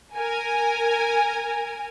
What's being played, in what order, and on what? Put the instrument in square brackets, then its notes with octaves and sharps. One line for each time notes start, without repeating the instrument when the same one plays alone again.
[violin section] A#4 G#5